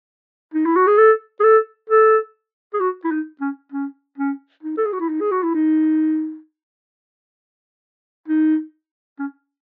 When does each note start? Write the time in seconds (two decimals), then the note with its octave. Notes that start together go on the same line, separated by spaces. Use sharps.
0.54 D#4
0.66 E4
0.76 F#4
0.87 G#4
0.98 A4
1.40 G#4
1.44 A4
1.90 A4
2.74 G#4
2.80 F#4
3.04 E4
3.11 D#4
3.41 C#4
3.72 C#4
4.18 C#4
4.63 D#4
4.77 A4
4.85 G#4
4.93 F#4
5.00 E4
5.09 D#4
5.20 G#4
5.31 F#4
5.43 E4
5.55 D#4
8.28 D#4
9.19 C#4